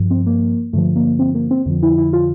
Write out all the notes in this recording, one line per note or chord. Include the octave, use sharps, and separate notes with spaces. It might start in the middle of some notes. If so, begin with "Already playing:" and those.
Already playing: G2 F3
C4
A#3
G2 D3 F3 A3
A#3
C4
A#3
C4
F2 D3 F3 C4
E4
E4
F4